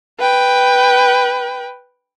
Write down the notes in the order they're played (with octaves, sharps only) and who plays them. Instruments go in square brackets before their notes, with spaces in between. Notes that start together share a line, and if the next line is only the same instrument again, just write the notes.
[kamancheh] B4 G5